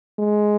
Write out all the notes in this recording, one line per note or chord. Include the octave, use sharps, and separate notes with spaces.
G#3